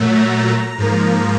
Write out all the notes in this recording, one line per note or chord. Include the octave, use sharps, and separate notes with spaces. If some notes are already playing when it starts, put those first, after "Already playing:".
Already playing: A#2 F#3 A3
A#5
G#2 F3 A#3